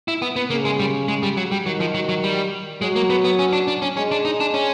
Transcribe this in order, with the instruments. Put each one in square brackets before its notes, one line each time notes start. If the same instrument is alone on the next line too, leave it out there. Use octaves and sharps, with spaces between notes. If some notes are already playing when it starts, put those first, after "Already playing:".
[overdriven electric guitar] E4
B3
B3
[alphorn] C#3 [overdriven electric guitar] A#3
[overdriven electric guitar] G#3
G3
G#3
G3
F#3
G3
[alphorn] D#3 [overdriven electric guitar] F#3
[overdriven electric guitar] F3
F#3
F#3
G3
[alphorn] F#3 [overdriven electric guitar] G#3
[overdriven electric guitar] A#3
B3
B3
C#4
D4
D4
C#4
[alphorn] G#3 [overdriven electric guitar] C#4
[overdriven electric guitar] D4
D#4
D4
C#4